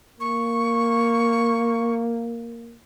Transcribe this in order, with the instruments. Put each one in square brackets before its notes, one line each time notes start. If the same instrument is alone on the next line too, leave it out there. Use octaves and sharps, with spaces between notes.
[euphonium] A#3 [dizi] C#6